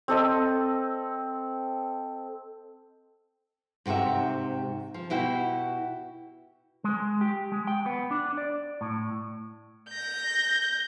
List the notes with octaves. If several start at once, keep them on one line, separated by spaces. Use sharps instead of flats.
C4 A4 D#5
G#2 C3 F#4 G4 E5
F3
B2 E4 F#4 G4
G#3
G4
G#3
G5
B3
D4
D5
A2
G6 A#6